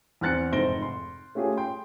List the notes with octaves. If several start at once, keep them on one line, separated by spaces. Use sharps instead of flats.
E2 C4 F6 F#6 A6 C#7
F1 G#2 C5 A#6 D7 G7
C6
A3 C#4 F4 G4 G#4
G5 C6